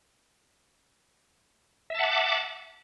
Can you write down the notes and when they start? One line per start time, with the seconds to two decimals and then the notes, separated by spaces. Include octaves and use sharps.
1.90 E5
1.95 A5
1.99 F#5
2.04 D6